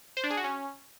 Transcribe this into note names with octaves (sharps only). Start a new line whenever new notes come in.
C5
D4
G#4
F#4
C#4